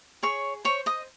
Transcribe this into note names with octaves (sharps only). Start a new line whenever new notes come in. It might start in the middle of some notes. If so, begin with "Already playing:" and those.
G#4 C#5 C#6
C5 C#5 C#6
D#5 D#6